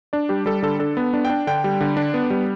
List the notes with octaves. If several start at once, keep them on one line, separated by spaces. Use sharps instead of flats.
D4 D5
G3 G4
G3 A4
D3 A4
D4 A4
B3
D4
G5
D4
D3 G5
G3
D3
D4
B3
G3